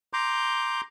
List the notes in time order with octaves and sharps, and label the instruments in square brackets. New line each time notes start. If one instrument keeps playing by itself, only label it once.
[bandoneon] A#5 C6 D6 G6